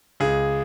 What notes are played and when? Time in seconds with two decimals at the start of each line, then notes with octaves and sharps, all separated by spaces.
0.20 C#2 G#4